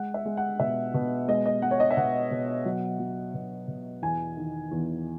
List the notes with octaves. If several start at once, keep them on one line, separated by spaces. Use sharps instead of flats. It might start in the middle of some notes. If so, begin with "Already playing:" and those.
Already playing: G#3 F#5
E5
G#3
F#5
B2 E5
B2
G#3 D#5
D#5
G#3 F#5
C#5
D#5
E5
B2 F#5
B2
F#3
F#3
B2
B2
E2 G#5
D#3
E2